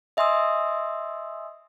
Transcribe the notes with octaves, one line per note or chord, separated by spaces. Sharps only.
D#5 E5 G#5 C6 D#6 E6